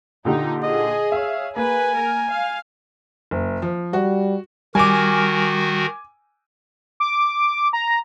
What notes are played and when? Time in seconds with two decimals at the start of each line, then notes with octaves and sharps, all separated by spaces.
0.25 A#2 D3 D#4 G4
0.63 G#4 D#5
1.12 C#5 E5 F5
1.56 A#3 B4 G#5
1.98 A#4
2.30 F5
3.31 F#1
3.62 F3
3.93 G3 F#4
4.75 D#3 G3 F#4 A#4 G#5 D6
7.00 D6
7.73 A#5